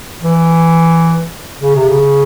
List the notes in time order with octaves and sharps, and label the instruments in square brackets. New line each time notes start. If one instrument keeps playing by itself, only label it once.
[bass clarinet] E3
C#3
C3
C#3